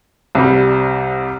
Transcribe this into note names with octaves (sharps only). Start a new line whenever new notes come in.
C2 C3 G3